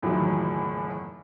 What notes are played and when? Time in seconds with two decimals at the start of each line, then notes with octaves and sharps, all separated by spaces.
0.02 F#1 E2 A2 D#3 F3 F#3